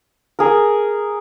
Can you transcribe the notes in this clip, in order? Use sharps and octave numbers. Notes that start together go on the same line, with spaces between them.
G#4 A#4